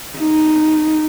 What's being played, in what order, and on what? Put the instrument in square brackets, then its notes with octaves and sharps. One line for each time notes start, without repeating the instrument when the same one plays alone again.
[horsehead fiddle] D#4